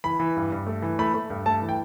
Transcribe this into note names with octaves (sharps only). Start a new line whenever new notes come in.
E3 B5
E3
G2
G2
A3
E3
A3 B5
A3
G2
A3 A5
E3
G5